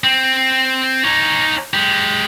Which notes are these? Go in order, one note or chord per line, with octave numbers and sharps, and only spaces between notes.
C4
D#4 C#5
G#3 G4